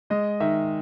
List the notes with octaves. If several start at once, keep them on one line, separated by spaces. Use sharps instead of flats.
G#3 D#5
D#3 E5